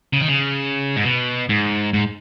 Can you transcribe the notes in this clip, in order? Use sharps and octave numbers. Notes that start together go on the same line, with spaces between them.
C#3
D#3
C#3
G#2
B2
G#2
G#2